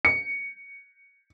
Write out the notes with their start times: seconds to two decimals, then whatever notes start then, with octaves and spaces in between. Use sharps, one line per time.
0.05 C#7